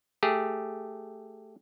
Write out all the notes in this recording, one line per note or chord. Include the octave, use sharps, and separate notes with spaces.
A3 G4 G#4